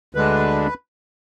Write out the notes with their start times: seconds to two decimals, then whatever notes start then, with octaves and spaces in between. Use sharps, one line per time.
0.15 D2 D3 G#3 D4 B4